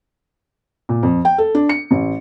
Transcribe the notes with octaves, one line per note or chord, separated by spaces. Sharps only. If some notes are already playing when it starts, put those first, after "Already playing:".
A#2
F2
G5
A4
D4
C#7
A1